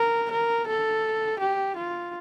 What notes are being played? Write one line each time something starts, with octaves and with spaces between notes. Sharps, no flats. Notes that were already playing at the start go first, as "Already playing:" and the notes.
Already playing: A#4
A#4
A4
G4
F4